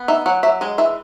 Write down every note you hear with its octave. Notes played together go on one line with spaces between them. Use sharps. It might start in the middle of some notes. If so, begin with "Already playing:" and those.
Already playing: B3
D#4 E5
F#3 F#5
F#3 E5
G#3 D#5
E3 E5